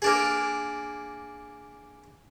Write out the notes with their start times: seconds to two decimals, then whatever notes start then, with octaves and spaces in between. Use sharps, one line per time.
0.02 A#3 D4 G#4